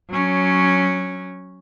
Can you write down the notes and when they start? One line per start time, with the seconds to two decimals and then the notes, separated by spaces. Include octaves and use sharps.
0.10 F#3 C#4